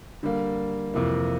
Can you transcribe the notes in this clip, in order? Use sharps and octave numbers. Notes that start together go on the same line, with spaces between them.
D3 G3 A#3
F2 C3 E3 A#3